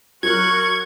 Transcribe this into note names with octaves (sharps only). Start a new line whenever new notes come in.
F#3 F#4 A#4 C#6 F#6 G#6